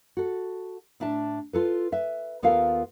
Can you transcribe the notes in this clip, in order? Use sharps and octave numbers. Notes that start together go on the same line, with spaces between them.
F#4 A4
A2 D4 E5 A5
F4 A4 B4
B4 E5
D#2 B3 F4 A4 A#4 F5